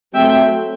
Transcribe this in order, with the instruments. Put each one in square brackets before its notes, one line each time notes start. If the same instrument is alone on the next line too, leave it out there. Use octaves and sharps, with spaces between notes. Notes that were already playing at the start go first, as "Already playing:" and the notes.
[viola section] F#3 A3 C4 E5 G5